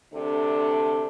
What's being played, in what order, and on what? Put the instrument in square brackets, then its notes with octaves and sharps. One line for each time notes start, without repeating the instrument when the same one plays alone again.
[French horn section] D2 C3 D4 A4